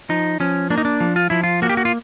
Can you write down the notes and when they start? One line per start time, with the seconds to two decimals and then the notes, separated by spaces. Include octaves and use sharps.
0.09 F3 D#4
0.40 F3 C#4
0.70 A#3 D4
0.78 D#4
0.85 D4
1.00 F3
1.16 F4
1.30 F3 E4
1.43 F4
1.62 A#3 F#4
1.69 G4
1.77 F#4
1.85 F4